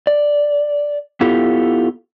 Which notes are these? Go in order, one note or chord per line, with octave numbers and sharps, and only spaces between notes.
D5
B3 E4 F4 G4 A4